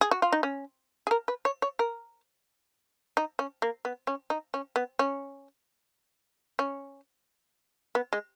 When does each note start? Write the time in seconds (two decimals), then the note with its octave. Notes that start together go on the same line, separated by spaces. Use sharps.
0.01 G#4
0.11 F#4
0.22 F4
0.32 D#4
0.43 C#4
1.07 G#4
1.11 A#4
1.28 B4
1.45 C#5
1.62 C#5
1.79 A#4
3.17 D#4
3.39 C#4
3.62 A#3
3.85 B3
4.07 C#4
4.30 D#4
4.54 C#4
4.76 B3
4.99 C#4
6.59 C#4
7.95 B3
8.13 G#3